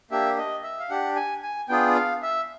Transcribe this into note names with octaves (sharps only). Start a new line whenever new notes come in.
A#3 D4 G4 E5
D#5
E5
F5
D4 G4 F#5
G#5
G#5
B3 D4 F4 G#4 G5
F5
E5